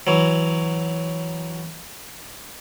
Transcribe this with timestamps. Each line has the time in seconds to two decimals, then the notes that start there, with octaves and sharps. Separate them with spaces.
0.07 E3 F#3